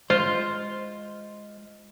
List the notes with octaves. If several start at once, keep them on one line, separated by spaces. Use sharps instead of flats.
G#3 F4 C5